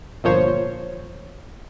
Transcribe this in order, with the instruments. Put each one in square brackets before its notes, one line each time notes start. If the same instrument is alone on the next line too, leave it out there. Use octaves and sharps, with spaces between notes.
[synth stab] G1 A#2 F3 C5 C#5